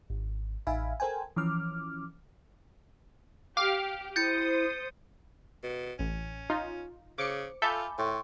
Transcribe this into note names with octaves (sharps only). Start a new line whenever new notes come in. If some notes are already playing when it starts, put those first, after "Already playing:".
G#1
A1 D#4 E5 F5 G#5 B5
A4 A#4 C5 G5 G#5
E3 F3 C#4 D6 F6
G4 F5 D6 F6
E4 C5 D#6 G6 A6 C#7
B2
A1 C#4
D#4 F4
C#3 C5 D6 C#7
F4 A4 E5 G#5 B5 D6 G6
A2 G5 C6 C#6